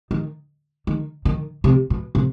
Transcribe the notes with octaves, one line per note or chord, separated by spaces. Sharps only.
D#3
D#3
D#3
C3
B2
C3